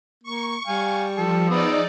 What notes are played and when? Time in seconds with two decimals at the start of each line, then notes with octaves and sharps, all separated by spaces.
0.23 A#3 C#6
0.67 G3 F5 G#5
1.17 F3 A4
1.50 G#3 B3 D#4 D5 D#6 E6